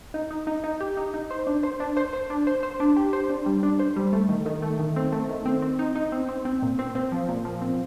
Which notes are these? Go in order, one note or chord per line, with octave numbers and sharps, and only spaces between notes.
D#4
D#4
D#4
D#4
G4
D#4
D#4
C5
D4
C5
D4
C5
C5
D4
C5
C5
D4
G4
C5
D4
G3
D4
C5
G3
A3
D#3
D#3
A3
D#3
C4
A3
D#3
C4
C4
D#4
D#4
C4
C4
C4
A#2
C4
C4
F3
A#2
F3
C4